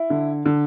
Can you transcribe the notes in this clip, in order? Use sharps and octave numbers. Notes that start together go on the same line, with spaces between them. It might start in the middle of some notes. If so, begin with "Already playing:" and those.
Already playing: E4
D3
D3